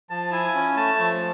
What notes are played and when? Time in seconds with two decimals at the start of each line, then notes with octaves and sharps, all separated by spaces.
0.10 F3 A5
0.31 E4 G#5
0.55 C#4
0.76 A3 A5
0.99 F3